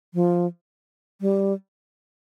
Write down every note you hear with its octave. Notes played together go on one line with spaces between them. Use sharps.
F3
G3